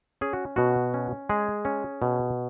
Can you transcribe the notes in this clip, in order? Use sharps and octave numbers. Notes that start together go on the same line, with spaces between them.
C#4 G#4
F#4
B2 F#4
C#4
G#3 G#4
C#4
B2